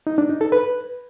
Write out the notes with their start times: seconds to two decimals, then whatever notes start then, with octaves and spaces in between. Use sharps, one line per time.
0.07 D#4
0.18 D4
0.29 D#4
0.41 A4
0.52 B4